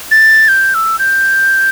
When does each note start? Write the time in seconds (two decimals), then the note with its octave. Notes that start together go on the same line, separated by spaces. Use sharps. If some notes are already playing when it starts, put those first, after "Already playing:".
0.11 A6
0.48 G6
0.74 E6
0.99 G6